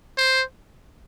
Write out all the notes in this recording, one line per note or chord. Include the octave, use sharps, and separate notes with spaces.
C5